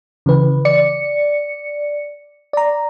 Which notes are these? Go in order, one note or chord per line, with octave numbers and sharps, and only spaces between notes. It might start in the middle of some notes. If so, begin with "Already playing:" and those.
C#3 E3 B4
D5 C#7
D5 A#5